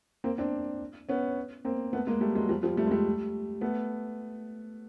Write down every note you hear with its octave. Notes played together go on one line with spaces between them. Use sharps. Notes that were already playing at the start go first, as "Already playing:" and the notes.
A#3 C4
C4 D4
B3 C#4
A#3 C4
A3 B3
G#3 A#3
G3 A3
F#3 G#3
F3 G3
F3 G3
G3 A3
G#3
G3 A3
A3 B3